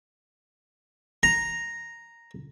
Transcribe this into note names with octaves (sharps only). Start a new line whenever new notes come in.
A#5